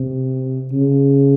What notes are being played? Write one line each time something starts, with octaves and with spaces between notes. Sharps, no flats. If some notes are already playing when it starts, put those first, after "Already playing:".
Already playing: C3
C#3